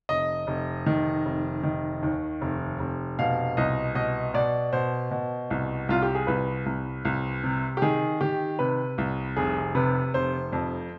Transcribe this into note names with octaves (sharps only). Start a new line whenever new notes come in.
F1 D#5
F1
D#3
F1
D#3
D#2
F1
F1
B2 F5
C2 D#5
B2 D#5
B2 D5
B2 C5
B2
C2
C2 F4
G4
G#4
C2 B4
C2
C2
C3
G4
D#3 G#4
D#3 G4
C3 B4
C2
F1 G#4
C3 B4
F1 C5
F2